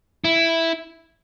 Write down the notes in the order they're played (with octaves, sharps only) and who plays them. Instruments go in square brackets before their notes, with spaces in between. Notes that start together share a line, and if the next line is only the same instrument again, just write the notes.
[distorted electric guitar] E4